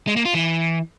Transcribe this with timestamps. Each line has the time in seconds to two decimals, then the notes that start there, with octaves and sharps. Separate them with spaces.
0.07 G#3
0.16 A#3
0.25 F4
0.34 E3